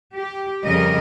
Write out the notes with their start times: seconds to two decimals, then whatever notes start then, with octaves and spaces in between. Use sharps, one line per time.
0.16 G4
0.65 F2 C#3 G3 A#4 D#5